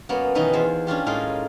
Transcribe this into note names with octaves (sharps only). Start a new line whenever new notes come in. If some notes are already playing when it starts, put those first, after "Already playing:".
F#2 A#3 B3 C#5 D#5
B2 D#3 E3 C#4 D#4 B4
E2 F4 C5
C#4 D4 F4 G4
A2 G#3 A#3 D#4 F4 F5